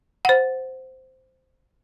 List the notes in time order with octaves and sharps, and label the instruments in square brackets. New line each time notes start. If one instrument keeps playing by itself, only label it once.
[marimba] C5 F#5